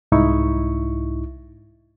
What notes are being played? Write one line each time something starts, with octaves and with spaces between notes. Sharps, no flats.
C2 G#2 D#4 E4 C#6